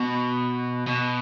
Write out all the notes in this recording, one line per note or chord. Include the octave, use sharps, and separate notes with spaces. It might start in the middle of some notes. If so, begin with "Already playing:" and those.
Already playing: B2
B2